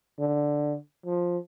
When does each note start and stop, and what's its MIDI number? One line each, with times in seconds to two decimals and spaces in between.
0.20 0.77 50
1.06 1.38 53